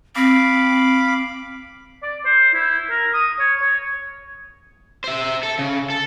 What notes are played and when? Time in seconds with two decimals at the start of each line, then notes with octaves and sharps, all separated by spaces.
0.16 C4 F5 B5 D6
2.03 D5
2.25 C5
2.54 E4
2.91 A#4
3.14 D#6
3.39 C#5
3.62 C#5
5.04 C5 E5
5.43 A4
5.59 C#3
5.90 A4